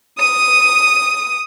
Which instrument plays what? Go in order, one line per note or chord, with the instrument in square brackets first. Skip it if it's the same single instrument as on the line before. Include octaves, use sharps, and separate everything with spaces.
[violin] D#6 D#7